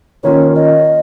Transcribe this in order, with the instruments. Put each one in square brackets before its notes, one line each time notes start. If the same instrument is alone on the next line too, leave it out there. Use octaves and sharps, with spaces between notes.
[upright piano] D#3 A#3 C#4 F4 [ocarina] C#5
[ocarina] D#5